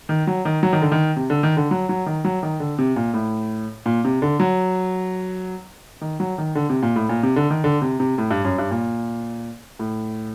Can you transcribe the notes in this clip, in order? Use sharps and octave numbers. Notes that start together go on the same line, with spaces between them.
D#3
F#3
D#3
F#3
D#3
D3
D#3
C3
D3
D#3
D3
F#3
F#3
D#3
F#3
D#3
D3
C3
A#2
A2
A#2
C3
D3
F#3
D#3
F#3
D#3
D3
C3
A#2
A2
A#2
C3
D3
D#3
D3
C3
C3
A2
G2
F#2
G2
A#2
A2